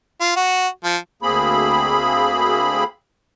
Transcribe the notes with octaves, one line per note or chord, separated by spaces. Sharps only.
F4
F#4
F3
D2 A#3 C4 G#4 B5